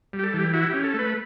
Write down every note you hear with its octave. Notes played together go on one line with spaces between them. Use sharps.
G3
G4
A4
E3 G4
E4 F#4
G4
C#4
A4
A3 B4